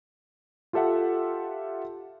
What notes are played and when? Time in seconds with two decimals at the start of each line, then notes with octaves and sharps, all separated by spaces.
0.73 F4 G4 A4 E5 F#5